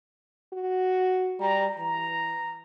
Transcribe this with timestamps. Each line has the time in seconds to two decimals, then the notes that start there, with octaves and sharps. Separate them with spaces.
0.53 F#4
1.40 G3 A#5
1.78 E3 A#5